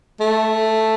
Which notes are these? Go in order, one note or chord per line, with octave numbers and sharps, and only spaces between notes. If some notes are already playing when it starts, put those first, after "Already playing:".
A3